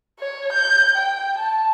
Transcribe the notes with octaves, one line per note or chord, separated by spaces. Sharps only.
C#5
G6
G5
A5